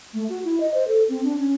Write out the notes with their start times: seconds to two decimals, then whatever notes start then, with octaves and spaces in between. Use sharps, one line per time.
0.14 A3
0.29 F#4
0.45 E4
0.60 D#5
0.74 C5
0.88 A4
1.09 C4
1.24 D4
1.39 C#4